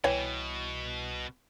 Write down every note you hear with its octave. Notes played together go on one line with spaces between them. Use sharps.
C2 B2 E3 C#5 G5